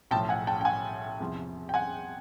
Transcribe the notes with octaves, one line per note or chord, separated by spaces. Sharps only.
B1 A2 F3 G5 A5
F#5 G#5
G5 A5
G5
F#5 G#5
E2 C3 F3
G5
F#5 G#5